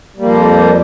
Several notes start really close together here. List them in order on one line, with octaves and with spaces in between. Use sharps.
G3 A#3 F3 F2